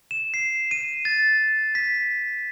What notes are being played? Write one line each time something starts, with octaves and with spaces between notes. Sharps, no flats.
E7
C7
D#7
A6
B6